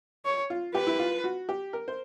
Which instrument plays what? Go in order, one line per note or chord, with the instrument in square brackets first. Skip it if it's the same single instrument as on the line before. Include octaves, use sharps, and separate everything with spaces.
[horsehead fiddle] C#5
[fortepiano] F4
[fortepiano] G4 [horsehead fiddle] B4
[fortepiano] E4
F4
F#4
G4
A#4
C5